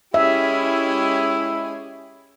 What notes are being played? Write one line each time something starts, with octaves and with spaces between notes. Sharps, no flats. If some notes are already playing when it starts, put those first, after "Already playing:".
G#3 C#4 E4 G4 G#4 E5